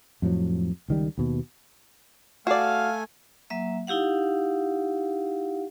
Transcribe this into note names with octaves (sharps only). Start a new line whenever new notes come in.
F2 A2 F3 F#3
C#2 D#3 G3
D#2 B2
A3 F#4 D5 F5 G#5
F#3 A#3 E5
D#4 E4 G4 F5 F#5